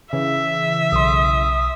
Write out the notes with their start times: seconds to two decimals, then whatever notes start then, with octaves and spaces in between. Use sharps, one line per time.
0.13 C#3 E3 E5
0.92 B1 C6 D#6